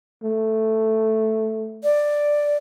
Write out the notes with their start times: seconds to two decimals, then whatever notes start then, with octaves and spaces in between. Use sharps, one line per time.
0.23 A3
1.83 D5